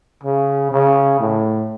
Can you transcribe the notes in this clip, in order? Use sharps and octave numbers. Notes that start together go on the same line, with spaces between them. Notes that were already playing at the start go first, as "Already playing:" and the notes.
C#3
C#3
A2